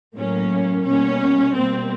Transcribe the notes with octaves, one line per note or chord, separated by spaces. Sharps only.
A2 F#3 A#3 C#4
B2 G3 A#3 C#4
B2 G3 A#3 C4